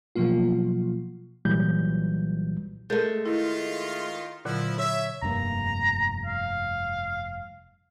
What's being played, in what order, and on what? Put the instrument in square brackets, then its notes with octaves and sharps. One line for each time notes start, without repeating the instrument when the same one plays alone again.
[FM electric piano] B2 F3 F#3 A#3 F4
[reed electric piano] C2 A#2 E3 F#3 G3 G6
[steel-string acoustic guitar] G#3 A3 [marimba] A#4 G6 A6
[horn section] D#3 F4 [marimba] E4
[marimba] A#2 D3 F#3 [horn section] F3 E4
[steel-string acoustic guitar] C#5 [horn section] E5
[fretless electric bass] F1 G2 A#3 [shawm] A#5
[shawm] F5